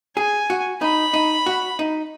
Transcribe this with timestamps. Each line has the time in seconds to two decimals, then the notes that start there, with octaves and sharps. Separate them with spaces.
0.16 G#4 G#5
0.50 F#4
0.81 D#4 B5
1.13 D#4
1.46 F#4
1.79 D#4